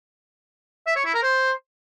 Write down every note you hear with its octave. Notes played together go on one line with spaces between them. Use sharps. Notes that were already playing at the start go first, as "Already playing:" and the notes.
E5
C#5
E4
A#4
C5